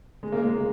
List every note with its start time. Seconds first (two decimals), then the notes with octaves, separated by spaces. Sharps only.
0.23 G#3
0.32 A#3
0.42 G#3